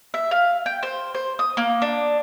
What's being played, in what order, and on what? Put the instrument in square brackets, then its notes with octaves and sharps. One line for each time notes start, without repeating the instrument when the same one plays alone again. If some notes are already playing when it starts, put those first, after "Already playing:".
[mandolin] E5
F5
G5
C5
C5
D#6
A#3
D4